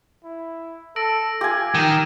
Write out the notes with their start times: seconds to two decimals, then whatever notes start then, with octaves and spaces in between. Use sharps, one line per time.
0.24 E4
0.96 A4 E6 A#6 D7
1.41 F4 G4 G#5
1.75 D#3 A#4 D#6 D#7 E7